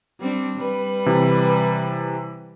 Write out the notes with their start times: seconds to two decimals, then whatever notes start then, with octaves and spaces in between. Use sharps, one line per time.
0.20 G3 C4 D4
0.58 G3 B4
1.06 C3 E3